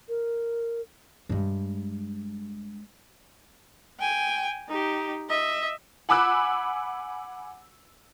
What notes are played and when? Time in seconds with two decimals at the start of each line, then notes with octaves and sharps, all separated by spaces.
0.09 A#4
1.29 G2 G#3
3.99 G5 G#5
4.69 D#4 G4
5.29 D#5 E5
6.09 F#5 G#5 B5 D6 E6 F#6